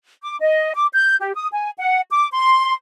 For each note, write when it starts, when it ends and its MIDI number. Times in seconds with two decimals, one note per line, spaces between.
0.23 0.36 86
0.40 0.73 75
0.74 0.86 86
0.93 1.16 91
1.20 1.35 67
1.35 1.47 87
1.52 1.69 80
1.79 2.00 78
2.10 2.27 86
2.32 2.73 84